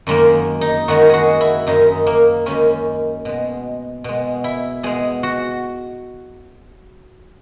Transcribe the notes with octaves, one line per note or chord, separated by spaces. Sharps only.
F#2 D#3 G#3 A#3
D#4
F#2 D#3 G#3 F#4
F#4 G#4
E4
F#2 D#3 G#3 D#4
A#3
F#2 D#3 G#3 C#4
B2 G#3
B2 G#3
E4
B2 G#3 G#4
F#4